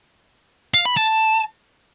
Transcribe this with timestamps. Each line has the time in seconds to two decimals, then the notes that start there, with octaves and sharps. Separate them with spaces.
0.74 F5
0.85 B5
0.97 A5